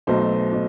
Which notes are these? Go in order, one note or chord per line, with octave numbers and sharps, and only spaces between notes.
B1 B2 A3 C5
B2